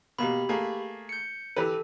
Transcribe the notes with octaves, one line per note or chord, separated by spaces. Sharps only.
B2 A#3 G4 B5
A3 A#3 G#4
G6 C#7
E3 G4 A4 B4